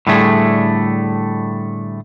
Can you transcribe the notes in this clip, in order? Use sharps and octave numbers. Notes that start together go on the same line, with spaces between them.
A2 D3 G3 A3 G#4